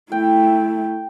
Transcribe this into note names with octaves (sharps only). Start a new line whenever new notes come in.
A3 E4 G5